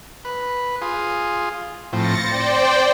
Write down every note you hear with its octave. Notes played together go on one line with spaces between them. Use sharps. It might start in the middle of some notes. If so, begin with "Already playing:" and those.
B4
F4 G#4
A2 F3 C4 A6 A#6 C#7
C4 C5 D5 G5